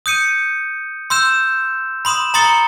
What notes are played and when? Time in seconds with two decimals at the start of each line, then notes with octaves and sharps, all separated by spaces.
0.06 D#6 G6 C#7 D#7
1.10 C6 E6 G6 E7
2.05 B5 C6 D#6 E7
2.34 A#5 C6 D#6 A6 C#7 G7